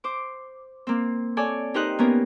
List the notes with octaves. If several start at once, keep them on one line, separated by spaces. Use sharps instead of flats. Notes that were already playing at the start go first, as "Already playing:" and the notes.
C5 D6
A#3 C4
A4 C#5 D5 G#5
D#4 G4 A#4 C5 D#5 F#6
A#3 B3 C#4 A#4